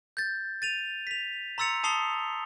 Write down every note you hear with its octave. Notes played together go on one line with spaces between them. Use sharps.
G6 A6
A6 D#7 F7
B6 F7
A#5 C6 E6 A6 C#7 F7
A5 D#6 C7 F7 G7